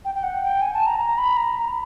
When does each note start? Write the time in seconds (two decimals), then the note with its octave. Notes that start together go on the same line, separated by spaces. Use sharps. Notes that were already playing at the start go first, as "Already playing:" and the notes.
0.05 G5
0.15 G5
0.23 F#5
0.43 G5
0.62 G#5
0.74 A5
0.86 A#5
0.99 A#5
1.18 B5
1.37 A#5